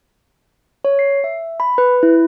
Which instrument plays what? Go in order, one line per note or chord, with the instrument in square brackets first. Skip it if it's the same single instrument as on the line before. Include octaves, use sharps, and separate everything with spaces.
[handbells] C#5
C7
E5
B5
B4
E4